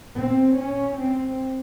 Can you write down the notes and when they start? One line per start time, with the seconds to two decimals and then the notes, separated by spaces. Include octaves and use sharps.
0.17 C4
0.58 C#4
1.00 C4